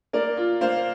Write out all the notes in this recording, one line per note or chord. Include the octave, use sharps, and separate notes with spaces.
A#3 A#4 D5
F4
A#3 C5 F5